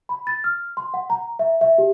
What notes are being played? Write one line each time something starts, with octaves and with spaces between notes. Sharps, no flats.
B5
A6
F6
C6
F#5
A#5
E5
E5
G4